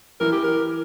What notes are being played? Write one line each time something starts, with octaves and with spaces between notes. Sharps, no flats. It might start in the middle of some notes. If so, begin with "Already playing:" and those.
E3 A#4
G4
A#4